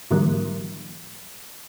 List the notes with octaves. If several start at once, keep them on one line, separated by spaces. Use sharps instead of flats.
G#2 D3 E3 F#3 G3 A#3